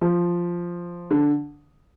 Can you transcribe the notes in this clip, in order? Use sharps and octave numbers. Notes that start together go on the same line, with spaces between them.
F3
D3